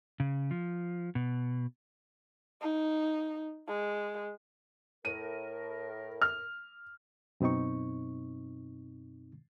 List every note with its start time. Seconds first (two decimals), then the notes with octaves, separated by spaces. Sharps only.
0.20 C#3
0.51 F3
1.15 B2
2.62 D#4
3.68 G#3
5.05 A2 A#4 D#7
6.22 F6
7.40 F#2 B2 C4 D#4 C#6